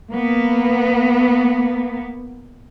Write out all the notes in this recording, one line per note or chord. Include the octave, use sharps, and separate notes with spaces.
A#3 B3